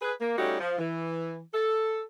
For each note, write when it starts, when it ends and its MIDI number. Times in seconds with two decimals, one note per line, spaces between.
0.02 0.13 68
0.02 0.13 71
0.21 0.34 58
0.38 0.57 55
0.38 0.57 57
0.38 0.57 61
0.38 0.57 63
0.38 0.57 66
0.38 0.57 67
0.60 0.75 53
0.78 1.40 52
1.54 2.02 69